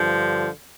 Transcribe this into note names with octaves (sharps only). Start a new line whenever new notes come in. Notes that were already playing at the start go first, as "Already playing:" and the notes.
Already playing: G2 D3 F3